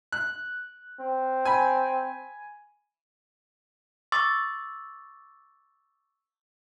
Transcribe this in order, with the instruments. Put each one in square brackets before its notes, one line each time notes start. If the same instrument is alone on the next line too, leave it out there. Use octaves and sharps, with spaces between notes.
[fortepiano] F#6
[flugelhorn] C4
[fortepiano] G#5 B5
[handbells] C#6 D6 E6 A6